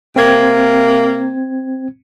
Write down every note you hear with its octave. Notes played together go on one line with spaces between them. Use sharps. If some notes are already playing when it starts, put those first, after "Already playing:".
C3 A#3 C4 G#6